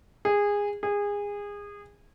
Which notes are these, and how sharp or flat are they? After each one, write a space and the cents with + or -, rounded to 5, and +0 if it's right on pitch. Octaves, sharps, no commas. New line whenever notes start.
G#4 -20
G#4 -25